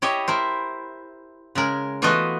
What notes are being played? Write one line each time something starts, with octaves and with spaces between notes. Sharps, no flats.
E4 G4 C#5 D#5
E4 A#4 C5
C#3 G#3 A#4
E3 A3 B3 F4 F#4 D#5